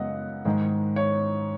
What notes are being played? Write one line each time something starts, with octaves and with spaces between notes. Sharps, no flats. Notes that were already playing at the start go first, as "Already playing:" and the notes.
Already playing: F#2 C#3 G#3 B3 D#5 F#5
G#2 D#3 G#3
C#5